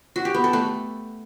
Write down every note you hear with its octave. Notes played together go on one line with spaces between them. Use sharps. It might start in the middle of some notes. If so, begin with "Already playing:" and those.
F#4
G4
B3
A4
A3